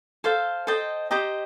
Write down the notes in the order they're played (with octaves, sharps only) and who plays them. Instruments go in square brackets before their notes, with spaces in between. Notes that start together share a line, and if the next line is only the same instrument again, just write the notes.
[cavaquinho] A4 C5 F5
A4 C5 D#5 G5
G4 C5 D#5 A#5